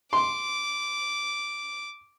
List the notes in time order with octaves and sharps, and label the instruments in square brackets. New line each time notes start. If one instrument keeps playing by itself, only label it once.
[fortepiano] C6 [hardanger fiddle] D6